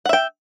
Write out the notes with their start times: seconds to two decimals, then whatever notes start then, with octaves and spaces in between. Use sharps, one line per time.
0.06 F#5
0.09 E5
0.13 G5